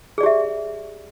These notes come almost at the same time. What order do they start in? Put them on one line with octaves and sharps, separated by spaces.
G#4 D5 G4 E5